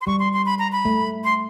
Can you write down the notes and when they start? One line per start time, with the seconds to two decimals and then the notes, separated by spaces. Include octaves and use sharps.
0.01 C6
0.07 G3 C#6
0.19 C6
0.33 C6
0.46 B5
0.59 A#5
0.72 B5
0.85 A3
1.24 C6